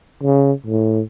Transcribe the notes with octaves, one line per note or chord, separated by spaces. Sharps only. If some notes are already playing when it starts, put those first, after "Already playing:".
C#3
A2